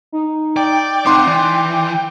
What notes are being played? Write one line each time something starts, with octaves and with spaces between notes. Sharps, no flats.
D#4
D5 G5
C4 D#4 F#5 C6 D6
E3 D5